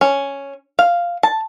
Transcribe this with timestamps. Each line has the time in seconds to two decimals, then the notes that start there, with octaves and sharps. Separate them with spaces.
0.01 C#4
0.79 F5
1.23 A5